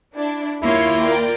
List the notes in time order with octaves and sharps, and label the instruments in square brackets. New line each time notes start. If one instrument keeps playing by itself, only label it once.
[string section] D4 E4
[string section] D#2 C#5 C6 [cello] A#3 F4 [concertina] E4
[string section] A#4 D5 G5